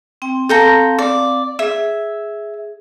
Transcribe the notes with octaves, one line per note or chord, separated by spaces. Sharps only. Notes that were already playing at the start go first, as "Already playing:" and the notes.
C4 G5
C4 A4 F5 G5 A#5
D5
G#4 E5